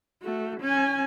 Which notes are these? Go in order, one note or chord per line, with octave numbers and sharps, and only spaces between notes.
A3 F#4
C#4 G#5